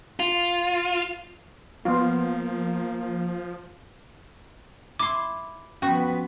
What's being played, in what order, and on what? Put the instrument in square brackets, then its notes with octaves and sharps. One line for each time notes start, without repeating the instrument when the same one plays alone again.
[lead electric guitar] F4
[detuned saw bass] F3 [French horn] A#3 [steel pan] B3 F4
[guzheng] E4 C6 [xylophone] D6
[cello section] F3 B3 B4 [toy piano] C#4 G5 [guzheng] F#4